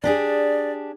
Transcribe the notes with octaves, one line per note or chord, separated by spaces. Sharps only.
D4 G4 G#4 D5